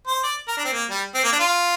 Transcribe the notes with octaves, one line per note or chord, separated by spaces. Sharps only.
C5
D5
A#4
D4
C4
A#3
G3
C4
A#3
D4
F4